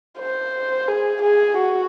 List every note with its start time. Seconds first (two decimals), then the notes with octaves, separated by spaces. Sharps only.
0.19 C5
0.88 G#4
1.22 G#4
1.58 F#4